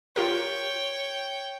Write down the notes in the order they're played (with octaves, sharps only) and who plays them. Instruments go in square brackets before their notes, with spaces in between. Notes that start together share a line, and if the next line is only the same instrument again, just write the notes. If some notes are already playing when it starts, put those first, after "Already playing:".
[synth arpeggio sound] F4 G4 A#4 [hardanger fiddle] C#5 G5